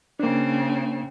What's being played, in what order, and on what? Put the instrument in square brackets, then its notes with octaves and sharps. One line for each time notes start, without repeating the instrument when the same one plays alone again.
[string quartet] C#3 C4 [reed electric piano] A#3 D4